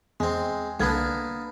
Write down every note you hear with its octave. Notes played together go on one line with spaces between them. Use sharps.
E2 G#3 C4
C2 D3 A#3 B3 D4 G#6